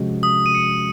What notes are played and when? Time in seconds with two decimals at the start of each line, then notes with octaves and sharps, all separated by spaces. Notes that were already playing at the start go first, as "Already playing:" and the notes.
Already playing: C3 F3 G#3 C#4 F#4
0.23 D#6
0.46 D#7
0.55 C#7